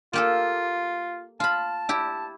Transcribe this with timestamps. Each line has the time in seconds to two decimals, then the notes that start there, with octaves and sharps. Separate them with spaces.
0.13 A#3 F4 G4 A4
1.40 F4 A5 B5
1.89 E4 G4